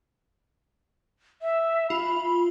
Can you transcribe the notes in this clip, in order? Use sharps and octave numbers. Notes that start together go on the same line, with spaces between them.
E5
F4 B5